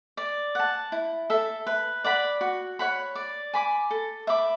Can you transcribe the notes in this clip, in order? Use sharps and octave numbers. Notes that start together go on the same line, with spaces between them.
D5
F#5 A5
E4
A4 E5
B4
D5 F#5 B5
F#4
C#5 F#5 B5
D5
G#5 B5 D6
A4
E5 B5 D6